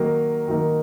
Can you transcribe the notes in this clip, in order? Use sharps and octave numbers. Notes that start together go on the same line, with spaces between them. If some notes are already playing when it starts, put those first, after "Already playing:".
Already playing: D#3 F#3 A#3 D#4 A#4
D#3 F#3 A#3 D#4 A#4